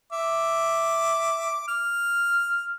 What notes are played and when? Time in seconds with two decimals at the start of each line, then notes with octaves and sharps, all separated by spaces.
0.13 E5 D6
1.68 F6